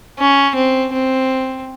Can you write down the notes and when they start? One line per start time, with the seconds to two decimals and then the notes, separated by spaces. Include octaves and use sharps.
0.19 C#4
0.55 C4
0.93 C4